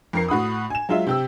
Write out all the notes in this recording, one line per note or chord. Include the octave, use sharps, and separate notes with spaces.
F2 A#4 C7
A2 F#4 B5 D#6
G#5 E7
F#3 G#3 F4 E5
C3 G4 E6